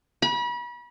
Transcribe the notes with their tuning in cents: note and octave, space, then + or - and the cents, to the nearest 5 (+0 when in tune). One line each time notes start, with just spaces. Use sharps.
B5 -35